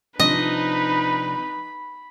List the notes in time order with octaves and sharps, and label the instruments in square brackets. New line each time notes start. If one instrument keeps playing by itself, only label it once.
[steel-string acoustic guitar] C3 F3 D4 [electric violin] D#4 B4 [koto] D#5 [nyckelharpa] B5